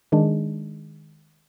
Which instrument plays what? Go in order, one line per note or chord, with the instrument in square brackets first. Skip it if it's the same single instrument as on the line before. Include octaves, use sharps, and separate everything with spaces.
[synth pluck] D#3 G#3 D4